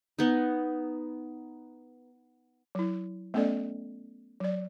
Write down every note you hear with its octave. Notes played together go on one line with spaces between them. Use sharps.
B3 D#4
F#3 E4
A3 B3 C#4 A4 D5 D#5
F#3 D5